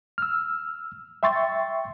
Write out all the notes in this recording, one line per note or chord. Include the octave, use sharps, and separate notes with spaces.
E6 F6
E5 G5 C6 C#6 A6